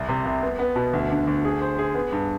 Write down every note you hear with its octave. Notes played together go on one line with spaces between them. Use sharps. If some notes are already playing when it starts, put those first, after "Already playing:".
Already playing: C2
C3
C2
B3
B3
B2
D2
D3
D2
G#4
C5
G#4
B3
G2